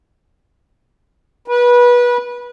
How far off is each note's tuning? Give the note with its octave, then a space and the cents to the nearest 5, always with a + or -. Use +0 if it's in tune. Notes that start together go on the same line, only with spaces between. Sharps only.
B4 -25